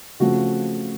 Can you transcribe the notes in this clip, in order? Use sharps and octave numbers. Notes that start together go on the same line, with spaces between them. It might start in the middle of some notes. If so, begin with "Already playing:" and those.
C#3 F3 A3 C4 F#4